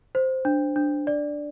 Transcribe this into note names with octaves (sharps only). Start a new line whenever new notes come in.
C5
D4
D4
D5